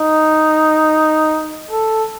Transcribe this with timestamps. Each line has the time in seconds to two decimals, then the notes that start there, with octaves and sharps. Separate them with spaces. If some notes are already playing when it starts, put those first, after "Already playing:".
Already playing: D#4
1.71 A4